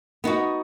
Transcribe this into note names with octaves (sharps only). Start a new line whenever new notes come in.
B3 D#4 F#4